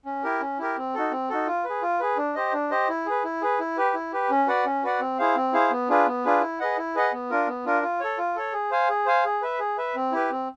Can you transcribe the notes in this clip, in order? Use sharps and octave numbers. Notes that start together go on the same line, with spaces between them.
C#4
E4 G4 A#4
C#4
E4 G4 A#4
C4
D#4 F#4 A4
C4
D#4 F#4 A4
F4
B4
G#4
F4
G#4 B4
D4
G4 C5 D#5
D4
G4 C5 D#5
E4
G#4 B4
E4
G#4 B4
E4
G4 B4
E4
G4 B4
C#4
F#4 B4 D5 F#5
C#4
F#4 B4 D5 F#5
C4
E4 G#4 C5 F5
C4
E4 G#4 C5 F5
B3
D4 F4 G#4 B4
B3
D4 F4 G#4 B4
E4
G#4 B4 D#5 F#5
E4
G#4 B4 D#5 F#5
B3
D4 F4 A#4
B3
D4 F4 A#4
F4
A4 C#5
F4
A4 C#5
G#4
C5 F5 G#5
G#4
C5 F5 G#5
G#4
B4 E5
G#4
B4 E5
C4
E4 G4 B4
C4